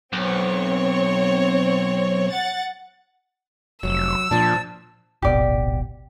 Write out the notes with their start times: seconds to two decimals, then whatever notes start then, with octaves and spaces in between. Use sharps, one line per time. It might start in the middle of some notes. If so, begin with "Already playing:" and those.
0.13 B1 C4 C#5
2.32 F#5 A6
3.83 F1 F#3 E6
4.31 A#2 F3 D4 A5
5.22 D1 G#1 B2 G4 D5